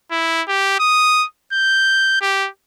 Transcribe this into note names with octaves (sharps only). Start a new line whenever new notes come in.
E4
G4
D#6
G6
G4